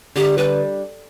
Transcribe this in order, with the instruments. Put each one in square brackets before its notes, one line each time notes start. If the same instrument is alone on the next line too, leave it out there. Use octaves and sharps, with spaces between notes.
[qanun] D3 [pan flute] G4
[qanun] G3 D4 [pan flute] B4